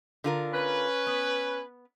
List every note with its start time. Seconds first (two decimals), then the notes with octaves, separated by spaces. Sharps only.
0.24 D3 F4 A#4
0.53 C#4 B4
1.07 B3